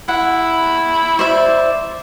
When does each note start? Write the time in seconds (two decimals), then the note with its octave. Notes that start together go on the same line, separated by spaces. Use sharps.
0.08 E4 F#5
1.19 C5 D5 E5